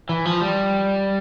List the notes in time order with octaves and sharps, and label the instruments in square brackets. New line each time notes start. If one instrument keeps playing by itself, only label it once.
[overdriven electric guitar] E3
F3
G3